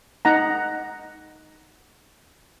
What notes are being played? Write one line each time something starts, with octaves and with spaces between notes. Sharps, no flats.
D#4 F#5 A#5